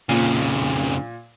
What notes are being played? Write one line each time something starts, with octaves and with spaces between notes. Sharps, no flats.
F2 A#2 C#3